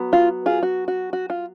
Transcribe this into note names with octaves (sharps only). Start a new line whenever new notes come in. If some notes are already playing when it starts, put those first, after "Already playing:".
Already playing: F#3 B3
F4
F4 G#4
F#4
F#4
F#4
F4